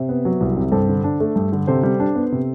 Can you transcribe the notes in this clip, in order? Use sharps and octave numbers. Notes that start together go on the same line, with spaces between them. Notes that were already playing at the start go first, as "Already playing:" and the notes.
Already playing: C3 C5 E5
B3
F#3
C2
C3
G2 A4 C5
D3
D4
A3
G2
D3
C3 A4 C5
G3
D4
B3
C3